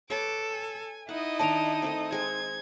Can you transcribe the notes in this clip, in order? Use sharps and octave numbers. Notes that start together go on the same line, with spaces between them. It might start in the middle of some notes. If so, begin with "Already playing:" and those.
A4 B4 C#5 D6
G#5
D#4 E4 D#5 F#5
D#3 D4 D5 A5 D7 F7
D#3 A3 C4
G#3 C4 C5 G#6